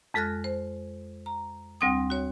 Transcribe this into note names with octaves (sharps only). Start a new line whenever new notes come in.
F2 G#3 A4 F6 F#6 A#6
C5
A#5
D2 G3 C4 G5 D#6
F#4 C#5